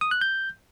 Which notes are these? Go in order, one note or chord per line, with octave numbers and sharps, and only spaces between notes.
D#6
F#6
G6